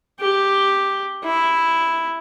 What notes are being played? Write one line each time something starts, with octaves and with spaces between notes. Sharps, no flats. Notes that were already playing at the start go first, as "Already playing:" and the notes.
G4
E4